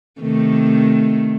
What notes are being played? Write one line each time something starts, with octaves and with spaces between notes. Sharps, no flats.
C3 D#3 A3